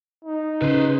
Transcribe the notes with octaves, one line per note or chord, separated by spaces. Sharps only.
D#4
C#3 B4 C5